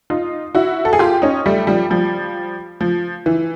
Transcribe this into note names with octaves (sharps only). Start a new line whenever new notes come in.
D#4 F4
E4 F#4
A4
G#4
F4 G4
C#4 D#4
G3 A3
F3 G3
F3 G3
F3
E3